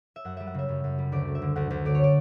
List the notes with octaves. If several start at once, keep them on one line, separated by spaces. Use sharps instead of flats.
E5
F#2 F#5
G3 E5
F#5
C#3 E5
F#2
F#2
G3
D2 D5
A3
E5
D3
D2 F#5
D2
A3 D5
C#5
D5